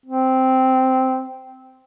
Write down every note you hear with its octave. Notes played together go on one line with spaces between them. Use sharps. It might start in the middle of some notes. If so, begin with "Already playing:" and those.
C4